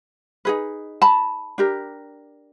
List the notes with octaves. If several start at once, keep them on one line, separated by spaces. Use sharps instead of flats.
D#4 G#4 B4
A5 B5
D4 G4 A#4